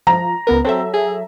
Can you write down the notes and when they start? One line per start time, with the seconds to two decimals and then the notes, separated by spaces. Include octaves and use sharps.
0.07 F3 A#5
0.47 C#2 B3 A#4 B4
0.65 F#3 C4 A4 E5
0.93 G#4